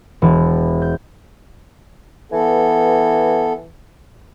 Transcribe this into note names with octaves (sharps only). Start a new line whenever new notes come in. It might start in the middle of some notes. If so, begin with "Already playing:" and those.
E1
G6
E3 B3 A4